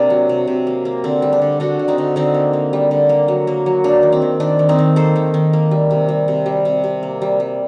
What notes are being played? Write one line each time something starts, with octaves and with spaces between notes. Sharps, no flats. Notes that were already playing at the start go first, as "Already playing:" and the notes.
Already playing: C3 A#3 C4 D4 A#4
F#3
C3
C3
A#3
A#3
D3 C4
G3
D4
D3
D3 D4 F#4
D3
C4 D#4
D3
D3 C4 D#4
A#3
A#3
G3
D3
A#3
F#3
A#3
F#3
A#3 D4
D#3
C4
D#3
D#3 D4
D#3
C4 D#4
D#3
A#3 A4 C5
D#3
D#3
A#3
G3
C3
G3
C3
G3
C3
C3
A#3
G3
G3